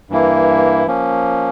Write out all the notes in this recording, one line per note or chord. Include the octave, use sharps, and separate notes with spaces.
G2 E3 A#3 E4
F3 A#3 C#4